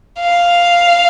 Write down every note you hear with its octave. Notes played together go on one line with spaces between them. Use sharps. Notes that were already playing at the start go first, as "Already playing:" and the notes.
F5